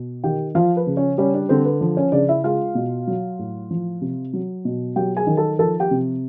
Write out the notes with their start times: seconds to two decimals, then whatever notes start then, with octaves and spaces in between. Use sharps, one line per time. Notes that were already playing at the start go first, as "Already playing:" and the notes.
Already playing: B2
0.24 D#3 G4 G5
0.55 F3 F4 F5
0.77 B4
0.87 C#3
0.97 C#4 C#5
1.18 G3 C#4 C#5
1.34 D4 D5
1.49 D3 C4 C5
1.65 B4
1.81 F3
1.97 C#4 C#5
2.12 C#3 D4 D5
2.29 E4 E5
2.44 G#3 F4 F5
2.75 B2
3.07 F#3
3.39 A2
3.71 F3
4.01 C3
4.33 F#3
4.65 B2
4.96 F#3 G4 G5
5.17 G#4 G#5
5.27 D#3
5.37 A4 A5
5.59 F3 A4 A5
5.80 G4 G5
5.91 C3